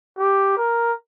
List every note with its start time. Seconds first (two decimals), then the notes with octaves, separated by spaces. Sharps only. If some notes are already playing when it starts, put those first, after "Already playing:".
0.18 G4
0.57 A#4